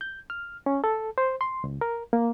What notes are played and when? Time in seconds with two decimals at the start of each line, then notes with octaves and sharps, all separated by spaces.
0.01 G6
0.30 F6
0.66 C#4
0.84 A4
1.18 C5
1.41 C6
1.64 C#2
1.81 A#4
2.13 A#3